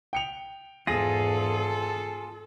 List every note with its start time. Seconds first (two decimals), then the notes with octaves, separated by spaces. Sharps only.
0.13 G5 C#7 F7
0.87 E2 G#2 F4 G#4 A4 A#6